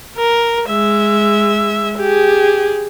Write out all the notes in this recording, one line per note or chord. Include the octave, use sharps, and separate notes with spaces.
A#4
G#3 E5
G4 G#4